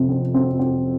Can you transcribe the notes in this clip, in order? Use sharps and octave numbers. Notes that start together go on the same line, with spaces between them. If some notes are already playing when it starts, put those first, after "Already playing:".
Already playing: F2 C3
C4
C4
C4